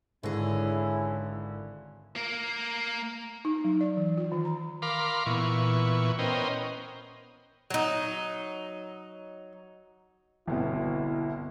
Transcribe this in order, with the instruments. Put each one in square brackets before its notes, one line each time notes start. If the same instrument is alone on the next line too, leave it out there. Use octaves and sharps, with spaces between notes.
[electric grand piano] G#1 D3 A#6 [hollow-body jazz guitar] G#2 [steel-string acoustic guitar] C#4 G#4 [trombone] E4
[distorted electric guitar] A#3 A#4
[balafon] D#4
F#3
D5
E3
F4
D#3
A#5
[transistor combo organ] A#4 F5 B5 C6 D6
A#2 E3 B3 C#6
B3 C#4 A#4 C5 D#5 G5
[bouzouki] F#3 D#4
[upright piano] G1 C2 B2 [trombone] E4